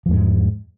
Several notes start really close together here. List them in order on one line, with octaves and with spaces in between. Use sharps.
F3 E2 G#3 G#2